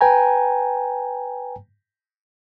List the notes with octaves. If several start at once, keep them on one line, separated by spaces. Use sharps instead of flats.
B4 G5 G#5 A#5